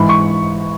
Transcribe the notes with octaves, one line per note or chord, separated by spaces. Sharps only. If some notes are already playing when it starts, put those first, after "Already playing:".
Already playing: G#2 E3 B5
C#6